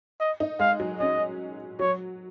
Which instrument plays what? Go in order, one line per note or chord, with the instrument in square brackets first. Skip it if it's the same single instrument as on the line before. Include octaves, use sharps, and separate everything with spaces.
[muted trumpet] D#5
[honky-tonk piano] D#4
[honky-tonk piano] G#3 [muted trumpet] F5
[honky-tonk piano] F#3
[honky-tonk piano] C#4 [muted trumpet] D#5
[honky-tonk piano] F#3 [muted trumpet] C#5